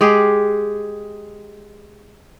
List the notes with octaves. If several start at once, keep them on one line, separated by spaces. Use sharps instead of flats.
G#3 G4 G#4